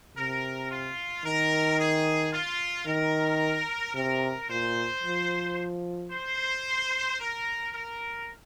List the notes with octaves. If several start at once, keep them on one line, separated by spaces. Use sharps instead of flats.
C3 A#4
F4
D#3 A#4
G#4
F4
D#3 A#4
C3 A#4
A#2 C5
F3
C5
A#4
A#4